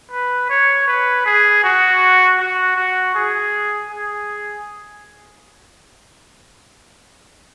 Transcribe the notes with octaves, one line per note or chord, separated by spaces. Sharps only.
B4
C#5
B4
G#4
F#4
F#4
F#4
G#4
G#4